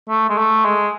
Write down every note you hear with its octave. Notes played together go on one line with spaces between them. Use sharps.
A3
G#3
A3
G#3